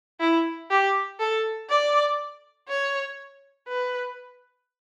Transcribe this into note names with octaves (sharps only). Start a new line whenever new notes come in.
E4
G4
A4
D5
C#5
B4